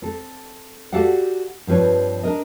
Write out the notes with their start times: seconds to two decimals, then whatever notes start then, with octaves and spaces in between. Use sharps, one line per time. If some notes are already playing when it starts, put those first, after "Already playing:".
0.02 C4 A4
0.93 F#4 G4 A4 D5 F5 F#5
1.67 G2 F3 C4 B4 C#5
2.23 D4 A#4 D#5